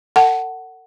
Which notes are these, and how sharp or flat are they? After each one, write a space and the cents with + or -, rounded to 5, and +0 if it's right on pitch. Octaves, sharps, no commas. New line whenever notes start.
A4 +45 F#5 +10 A5 +0